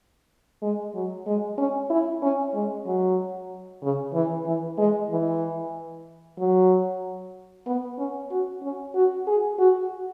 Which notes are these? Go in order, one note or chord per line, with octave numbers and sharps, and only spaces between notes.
G#3
F#3
G#3
C#4
E4
C#4
G#3
F#3
C#3
E3
E3
G#3
E3
F#3
B3
C#4
F#4
C#4
F#4
G#4
F#4